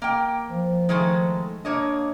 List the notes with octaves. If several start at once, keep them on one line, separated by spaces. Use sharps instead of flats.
A#3 G5
F3
D#3 G#3 A3
A#3 D4 C#5 D#5